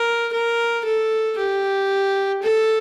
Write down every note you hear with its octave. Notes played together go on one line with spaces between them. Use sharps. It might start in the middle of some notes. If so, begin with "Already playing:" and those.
Already playing: A#4
A#4
A4
G4
A4